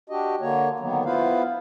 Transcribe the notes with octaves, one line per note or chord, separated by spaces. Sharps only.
D4 F#4 G4 D#5
D3 A#3 C#5
D3 D#3 F#3 A#3 B3
B3 E4 F4 B4 C5 F5